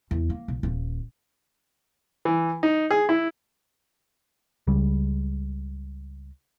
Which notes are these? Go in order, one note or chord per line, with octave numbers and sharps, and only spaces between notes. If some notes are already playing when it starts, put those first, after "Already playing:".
E2
A#3
B1
D#1
E3
D#4
G#4
E4
C#2 C#3 G3